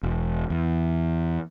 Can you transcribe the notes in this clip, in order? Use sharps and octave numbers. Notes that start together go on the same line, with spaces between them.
E1
E2